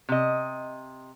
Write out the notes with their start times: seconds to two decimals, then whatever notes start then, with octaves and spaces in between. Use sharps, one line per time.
0.09 C3 D#5